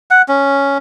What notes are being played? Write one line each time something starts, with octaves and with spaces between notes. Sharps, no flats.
F#5
C#4